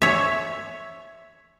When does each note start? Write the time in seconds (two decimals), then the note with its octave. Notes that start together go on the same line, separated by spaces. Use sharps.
0.02 C#5 E5